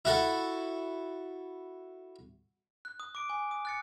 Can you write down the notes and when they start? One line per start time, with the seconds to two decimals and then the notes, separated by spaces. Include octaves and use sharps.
0.05 E4 F#4 A4
2.85 F#6
3.00 D#6
3.15 D6 D7
3.30 G#5
3.51 D#6
3.65 F#6 A6 C#7